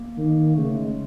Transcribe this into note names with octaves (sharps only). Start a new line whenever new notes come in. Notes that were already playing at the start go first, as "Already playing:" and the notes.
Already playing: A#3
D#3
A#3
C#3 A3
G#3